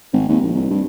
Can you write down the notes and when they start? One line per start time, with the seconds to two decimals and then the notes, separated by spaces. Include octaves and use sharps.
0.13 G#1
0.29 D#2
0.42 A#1
0.55 C2
0.70 G2